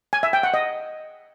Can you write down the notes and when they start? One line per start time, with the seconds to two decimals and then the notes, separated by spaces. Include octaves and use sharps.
0.13 G#5
0.23 E5
0.33 G5
0.43 F#5
0.54 D#5